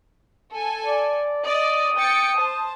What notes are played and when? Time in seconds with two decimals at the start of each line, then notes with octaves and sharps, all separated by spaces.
0.52 A4 G#5
0.86 D5
1.45 D5 D#5 D#6
1.95 G5 A6 C#7
2.35 C5 A5